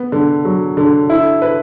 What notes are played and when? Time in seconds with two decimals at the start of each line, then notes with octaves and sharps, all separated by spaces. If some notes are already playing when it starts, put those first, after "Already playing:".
Already playing: B3
0.12 D3
0.45 F#3
0.77 D3
1.10 E4
1.42 B4